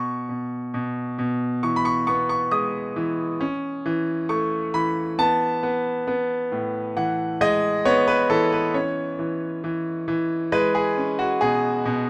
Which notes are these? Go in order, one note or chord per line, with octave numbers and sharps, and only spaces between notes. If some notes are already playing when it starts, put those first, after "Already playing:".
Already playing: B2 C#6
B2
B2
B2
E3 C#6
B5
C#6
B3 C#6
C#6
G#3 D#6
E3
C#4
E3
A3 C#6
E3 B5
B3 A5
B3
B3
A2
E3 F#5
G#3 D#5
B3 C#5
B4
E3 A4
B4
C#4 C#5
E3
E3
E3
G#3 B4
G#4
C#4
F#4
B2 G#4
B2